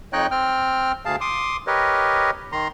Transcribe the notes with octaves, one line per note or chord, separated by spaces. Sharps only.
F2 D#4 C#5 D#5 G5 F#6
C4 G5 F6
D2 G#4 F5 A5
C6 D6 D#6
G4 A#4 B4 C#5 D#5
D#3 A#5 C6